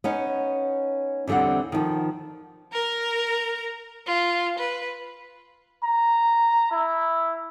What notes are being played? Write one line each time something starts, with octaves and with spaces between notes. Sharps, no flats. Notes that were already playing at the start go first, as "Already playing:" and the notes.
B3 C#4 D#4
E2 D3 G3 C4 F#5
D#3 F3
A#4 A#5
F4
B4
A#5
E4